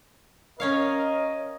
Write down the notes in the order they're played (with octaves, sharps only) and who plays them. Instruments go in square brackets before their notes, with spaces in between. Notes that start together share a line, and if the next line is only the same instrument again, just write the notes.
[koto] C#4 C#5 F5 [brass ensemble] A#4 D#5